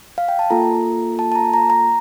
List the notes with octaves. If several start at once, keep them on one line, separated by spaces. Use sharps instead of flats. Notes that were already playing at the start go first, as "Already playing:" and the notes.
F5
G5
A5
A#3 F4 A4 A#5
A5
A5
A#5
A#5
A#5